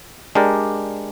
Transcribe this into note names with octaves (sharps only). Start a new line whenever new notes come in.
G#3 D4 G4 A#4 D5